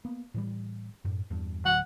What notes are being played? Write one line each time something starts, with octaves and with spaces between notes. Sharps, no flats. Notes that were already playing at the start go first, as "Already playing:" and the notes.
A#3 B3
A2 E3 G3
F#2 A2
E2 G2
D1 D2 F#3 F#5